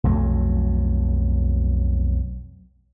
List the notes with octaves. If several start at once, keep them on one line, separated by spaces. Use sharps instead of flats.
B1 F2 F#3 A3